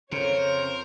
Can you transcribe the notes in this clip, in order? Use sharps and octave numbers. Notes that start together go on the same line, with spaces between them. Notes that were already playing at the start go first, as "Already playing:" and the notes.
F2 C#3 A#4 C5 C#5